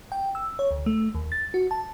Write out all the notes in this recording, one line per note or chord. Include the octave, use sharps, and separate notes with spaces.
G5
E6
C#5
D2
A3
D#2
A6
F#4
A5